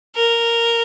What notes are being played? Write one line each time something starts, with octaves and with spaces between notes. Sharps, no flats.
A#4